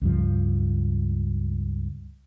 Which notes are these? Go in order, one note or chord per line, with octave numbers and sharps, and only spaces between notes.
C#2 G2 F3